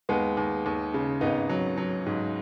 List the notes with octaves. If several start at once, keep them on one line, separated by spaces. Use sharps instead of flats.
D#2 G#3 B3
D#2
D#2
C#3
G#1 B3 D#4
F#3
F#3
G#2